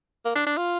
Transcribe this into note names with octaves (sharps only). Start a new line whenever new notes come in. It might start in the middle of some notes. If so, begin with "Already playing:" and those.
A#3
D4
D4
F4